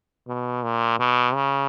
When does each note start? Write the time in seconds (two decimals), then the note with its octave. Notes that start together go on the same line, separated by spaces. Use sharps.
0.28 B2
0.63 A#2
1.00 B2
1.35 C#3